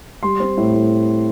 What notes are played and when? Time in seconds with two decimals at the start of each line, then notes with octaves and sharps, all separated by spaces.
0.23 G3 C6
0.40 C4
0.57 A2
0.74 A2